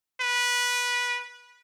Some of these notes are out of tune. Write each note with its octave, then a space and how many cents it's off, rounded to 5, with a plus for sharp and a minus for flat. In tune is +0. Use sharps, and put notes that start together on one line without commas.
B4 -15